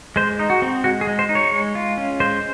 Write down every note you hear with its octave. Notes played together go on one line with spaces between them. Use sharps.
G#3 C5
D#4
F#4
C4
G#3 F#4
G#4
G#3
C5
D#4
C#5
G#3
F4
C#4
G#3 C5